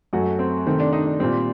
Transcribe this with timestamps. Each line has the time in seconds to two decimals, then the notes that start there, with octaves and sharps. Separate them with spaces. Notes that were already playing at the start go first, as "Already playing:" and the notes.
0.13 F#2 F#3 A3 F#4
0.39 C4
0.66 C3 D#3 A3 C4
0.80 D4
0.93 D#4
1.06 D4
1.20 A#2 G3 C4